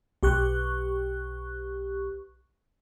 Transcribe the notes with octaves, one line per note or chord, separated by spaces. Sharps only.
B1 G4 C#6 F#6